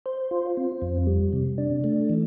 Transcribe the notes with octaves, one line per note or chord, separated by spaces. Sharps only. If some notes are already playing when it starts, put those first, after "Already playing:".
C5
F4
C4
F2
G3
C3
D4
A3
E3